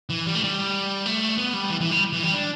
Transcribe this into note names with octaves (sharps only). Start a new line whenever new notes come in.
E3
G3
A3
G3
A3
B3
G3
E3
E3
G3
E3
G3
D4